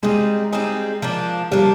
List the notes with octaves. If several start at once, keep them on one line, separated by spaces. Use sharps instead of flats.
G3 G#3 C4 D#4 G#4
G3 C4 D#4 G#4
F3 A#3 D4
F3 G3 A#3 D4